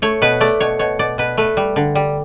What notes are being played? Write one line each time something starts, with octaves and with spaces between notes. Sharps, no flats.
A3 C#5
B2 B4
A3 D5
B2 C#5
B2 C#5
B2 D5
B2 B4
A3 B4
G3
D3
G3